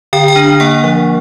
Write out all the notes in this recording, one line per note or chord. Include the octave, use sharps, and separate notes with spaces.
D3 G5
G5
D4
A#3 F#5
F3